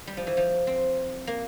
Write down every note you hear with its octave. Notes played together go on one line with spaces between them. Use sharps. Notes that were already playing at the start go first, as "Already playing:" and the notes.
G3
F3
E3
F3
C4
A#3